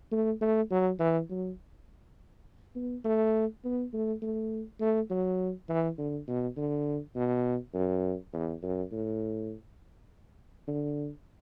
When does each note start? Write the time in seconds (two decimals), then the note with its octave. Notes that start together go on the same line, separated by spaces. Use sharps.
0.12 A3
0.41 A3
0.71 F#3
1.00 E3
1.30 F#3
2.76 B3
3.05 A3
3.64 B3
3.93 A3
4.22 A3
4.81 A3
5.11 F#3
5.69 E3
5.98 D3
6.27 B2
6.57 D3
7.15 B2
7.74 F#2
8.33 E2
8.62 F#2
8.92 A2
10.68 D3